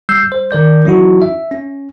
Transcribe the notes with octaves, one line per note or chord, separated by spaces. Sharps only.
G3 E6 G6 C7
G3 C5
D#3 A#4 D5 G6
E3 F#3 C#4 D#4 E4 F#4
E5
C#4